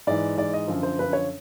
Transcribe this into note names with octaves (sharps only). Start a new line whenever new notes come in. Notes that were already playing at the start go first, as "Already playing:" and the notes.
G#2 E3 D5
G#2 E3 D5
D#5
F#2 D3 F3
C5
F#2 D3 F3 B4
C#5